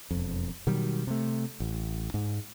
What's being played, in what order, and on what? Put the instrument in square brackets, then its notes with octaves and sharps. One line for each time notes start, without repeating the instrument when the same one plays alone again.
[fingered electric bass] E1 F2
B2 D#3 F#3 G3
C3 A3
A1
G#2